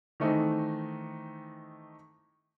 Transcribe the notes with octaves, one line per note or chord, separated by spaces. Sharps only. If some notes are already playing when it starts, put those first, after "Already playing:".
D#3 E3 A3 C4 D#4